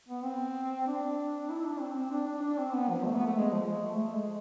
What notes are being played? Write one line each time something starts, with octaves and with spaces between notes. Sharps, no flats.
B3
C4
D4
E4
D4
C4
C4
D4
D4
D4
C4
B3
F3
A3
B3
A3
G#3
F3
G#3
A3
A3
G#3